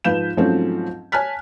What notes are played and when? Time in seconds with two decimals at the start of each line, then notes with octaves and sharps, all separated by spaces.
0.04 G#2 F3 B4 F5 G6 E7
0.37 G#2 F3 F#3 A3 C4 C#4
1.12 C#5 G#5 A5 F6 F#6 B6